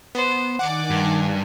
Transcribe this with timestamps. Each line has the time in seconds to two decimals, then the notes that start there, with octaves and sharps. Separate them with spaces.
0.15 B3 C5
0.59 D#3 D5 F#5 G#5 D6
0.90 G2